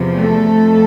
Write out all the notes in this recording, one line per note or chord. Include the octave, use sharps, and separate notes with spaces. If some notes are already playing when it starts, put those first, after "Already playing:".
Already playing: E2 C3 F3
A3 A4
F2